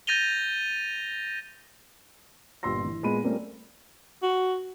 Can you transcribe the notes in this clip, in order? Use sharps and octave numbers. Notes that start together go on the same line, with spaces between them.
G6 A6 A#6 D#7 F7 G7
G1 A#2 G4 C6 E6 A#6
E3
A#2 G#3 B3 B5 D#7
G3 A3 A#3 C4 C#4 F4
F#4